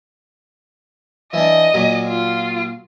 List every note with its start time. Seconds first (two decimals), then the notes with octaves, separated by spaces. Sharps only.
1.33 E3 D4 D#5
1.74 A#2 F#3
2.07 F4